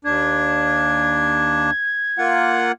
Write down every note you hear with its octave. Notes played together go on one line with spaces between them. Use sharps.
D#2 D4 G#6
A#3 F4 F#5